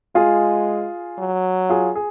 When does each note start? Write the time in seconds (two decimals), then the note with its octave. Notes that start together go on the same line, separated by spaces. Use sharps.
0.15 G#3 F4 G#4
1.19 F#3
1.69 F4 G#4
1.95 G#4